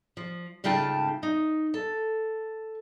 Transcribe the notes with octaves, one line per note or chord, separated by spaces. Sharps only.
F3
G#2 C#3 A3 F4 G5 A5
D#4
A4